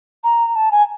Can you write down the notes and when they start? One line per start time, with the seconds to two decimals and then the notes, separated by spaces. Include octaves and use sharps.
0.24 A#5
0.55 A5
0.71 G#5